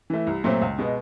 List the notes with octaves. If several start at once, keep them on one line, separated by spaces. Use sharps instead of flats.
E3 A3
C2
A#2 F#3 A3 C4
C#2
B2 G#3 B3